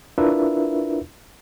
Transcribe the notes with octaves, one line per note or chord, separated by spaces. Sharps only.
D4 E4 F4 A#4 B4 E5